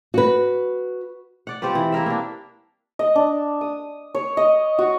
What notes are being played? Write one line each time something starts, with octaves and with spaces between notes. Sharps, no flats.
F#4 B4
D5 F#5
C4 F4 G4 B4
E3
A#3 E4 A#4 E5
A#3 D4
D#5
D4
D#6
C#5
D#5
F#4